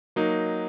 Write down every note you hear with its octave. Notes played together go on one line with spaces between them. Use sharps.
F#3 A#3 D#4